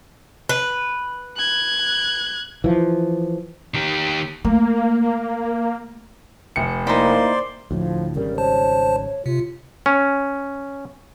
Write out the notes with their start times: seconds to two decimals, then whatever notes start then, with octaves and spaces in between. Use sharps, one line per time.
0.49 B4
1.36 F#6 G#6
2.64 E3 F3
3.74 D#3 G4
4.45 A3 A#3
6.56 F1 C#7
6.87 A#3 D#4 E4 C5 D5 C6
7.71 D2 A2 F3
8.16 G#1 C#3 G3 A#4
8.38 C5 C#5 A5
9.26 C3 F4
9.86 C#4